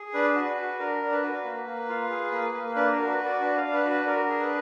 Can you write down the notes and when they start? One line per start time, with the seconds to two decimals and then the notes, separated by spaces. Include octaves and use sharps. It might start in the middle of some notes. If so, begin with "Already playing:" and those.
Already playing: G#4
0.14 D4 B4
0.35 F#4
0.58 F#4
0.79 D4 A#4
1.01 D4
1.12 B4
1.23 F#4
1.45 A#3
1.67 A#3
1.89 F4
2.10 G#4
2.32 A#3
2.54 A#3
2.75 D4 B4
2.92 A#4
2.98 F#4
3.08 B4
3.19 F#4
3.25 D5
3.41 D4 B4
3.57 F5
3.63 D4
3.74 B4
3.84 F#4
3.90 B4
4.06 D4 A#4
4.28 G#4
4.40 B4